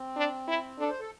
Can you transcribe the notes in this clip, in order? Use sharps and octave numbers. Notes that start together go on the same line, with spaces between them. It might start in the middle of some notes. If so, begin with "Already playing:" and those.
Already playing: C4
D4
E4
D4 A4
C5
A4